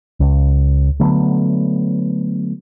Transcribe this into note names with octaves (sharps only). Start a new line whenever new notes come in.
C#2
D3 F#3 A3 B3